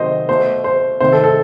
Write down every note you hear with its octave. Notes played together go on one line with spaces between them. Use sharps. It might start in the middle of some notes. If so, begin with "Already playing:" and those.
Already playing: C3 D#3 F#3 A3 C5 D#5
B2 A3 C5
C5
C3 D#3 A3 C5
A4
A4